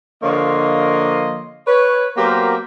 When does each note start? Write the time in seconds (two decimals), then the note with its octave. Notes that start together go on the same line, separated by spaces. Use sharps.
0.22 D3 F3 A#3 C#5 D#5 C6
1.67 B4 C#5
2.16 F#3 A#3 B3 G4 A#4 C5